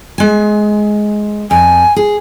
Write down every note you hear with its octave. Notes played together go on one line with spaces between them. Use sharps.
G#3 G#5
F2 G#5
G#4